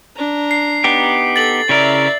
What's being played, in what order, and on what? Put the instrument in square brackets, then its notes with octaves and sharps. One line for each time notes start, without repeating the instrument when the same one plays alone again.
[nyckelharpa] D4 A#5
[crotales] C7
[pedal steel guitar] B3 D#4 G4
[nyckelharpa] A4 [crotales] A6 F#7
[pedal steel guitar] C#3 E4 A#4 [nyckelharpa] D5 E5